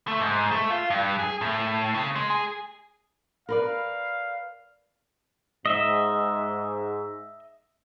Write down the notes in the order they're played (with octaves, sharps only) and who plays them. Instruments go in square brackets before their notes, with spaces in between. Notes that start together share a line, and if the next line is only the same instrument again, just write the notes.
[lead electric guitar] A3
G#2
A3
F4
G2
G#4
A2
C#3
G#3
G#4
[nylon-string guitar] A#4 B4 D5 [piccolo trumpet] F5
[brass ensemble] G#2 [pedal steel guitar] D#5 E5